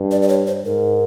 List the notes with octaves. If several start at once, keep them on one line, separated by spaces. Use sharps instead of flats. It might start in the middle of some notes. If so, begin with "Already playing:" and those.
Already playing: G2
D5
D5
C#5
C5
G#2 A#4